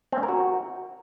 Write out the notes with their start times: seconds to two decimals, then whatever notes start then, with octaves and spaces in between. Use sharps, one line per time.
0.12 C4
0.18 C#4
0.23 A#4
0.28 F#4